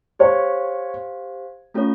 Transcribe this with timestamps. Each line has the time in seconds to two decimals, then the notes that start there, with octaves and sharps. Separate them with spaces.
0.19 G4 C5 C#5 F5
1.74 A3 C#4 F4 A4 C#5